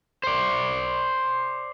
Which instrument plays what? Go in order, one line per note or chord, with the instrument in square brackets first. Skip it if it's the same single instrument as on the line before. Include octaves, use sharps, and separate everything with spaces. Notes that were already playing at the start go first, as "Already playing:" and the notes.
[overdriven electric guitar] C5 D5